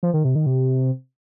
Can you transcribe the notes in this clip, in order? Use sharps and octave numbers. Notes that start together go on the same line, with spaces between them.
F3
D#3
C3
D#3
C3